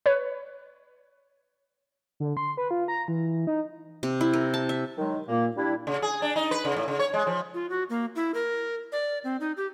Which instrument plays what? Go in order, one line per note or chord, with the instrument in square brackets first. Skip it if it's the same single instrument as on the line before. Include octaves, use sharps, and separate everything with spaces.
[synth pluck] B4 C#5
[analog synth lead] D3
C6
B4
F4
A#5
E3
D#4
[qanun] C3
E4
A#4
A5
E5
[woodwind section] D#3 F#3 G#3
A#2 A#3
G3 D4 E4
[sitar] C#3
G#4
D4
D#4
B4
C#3
A2
C#3
C#5
G#3
F3
[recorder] F4
F#4
A#3
E4
A#4
D5
C4
D#4
G4